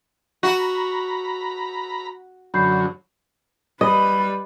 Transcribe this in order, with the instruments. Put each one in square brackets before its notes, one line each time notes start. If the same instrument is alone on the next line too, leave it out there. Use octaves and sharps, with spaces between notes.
[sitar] F#4 [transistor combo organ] A#5 B5
[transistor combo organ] F#2 D3 F#3 [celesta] B5 G6 C7
[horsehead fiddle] G3 B4 [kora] D#5